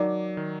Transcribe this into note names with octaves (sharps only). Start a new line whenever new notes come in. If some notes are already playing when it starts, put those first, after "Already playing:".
Already playing: F#3 D#4 A#4 D5
D#3